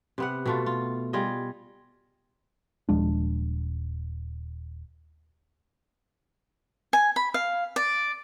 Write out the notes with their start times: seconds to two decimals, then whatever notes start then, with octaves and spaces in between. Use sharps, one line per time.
0.18 C3 B3 F#5
0.46 B2 A3 F4
0.66 F4
1.13 G3 F4 G#4 D#5
2.89 D#1 F3 G#3 D4
6.93 G#5
7.16 B5
7.34 F5
7.76 D5